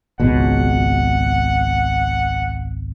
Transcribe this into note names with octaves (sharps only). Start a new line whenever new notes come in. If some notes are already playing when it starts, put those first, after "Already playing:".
G#1 C#2 B2 F#5